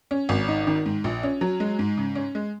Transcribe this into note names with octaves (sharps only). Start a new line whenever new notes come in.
C#4
G#1
D#4
D#3
G#2
A#1
C#4
F#3
G#3
G#2
C#3
C#4
G#3